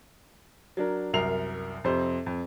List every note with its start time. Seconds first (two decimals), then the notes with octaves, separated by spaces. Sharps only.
0.77 F#3 D4 A#4
1.13 C2 F#2 A#4 C7 F7
1.84 F2 C3 C5
2.26 F2